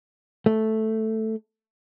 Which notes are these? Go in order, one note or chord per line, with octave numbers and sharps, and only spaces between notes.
A3